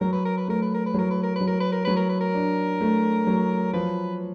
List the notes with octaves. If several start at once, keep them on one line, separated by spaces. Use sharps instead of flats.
F#3 A#4
B4
A#4
B4
A3 A#4
B4
A#4
B4
F#3 A#4
B4
A#4
B4
F#3
A#4
B4
A#4
F#3 B4
A#4
B4
A#4
D4
A3
F#3
F3 B4